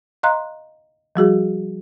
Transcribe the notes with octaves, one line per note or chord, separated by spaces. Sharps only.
D#5 F5 A#5 C6 F#6
F3 G3 F#4 G#4